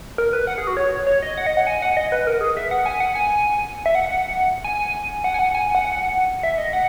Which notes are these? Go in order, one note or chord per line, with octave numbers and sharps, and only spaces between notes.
A#4
B4
F#5
G#4
F#4
C#5
C#5
D#5
F#5
D#5
F#5
G#5
F#5
D#5
B4
A#4
G#4
E5
F#5
G#5
F#5
G#5
E5
F#5
G#5
F#5
G#5
F#5
G#5
F#5
E5
D#5
F#5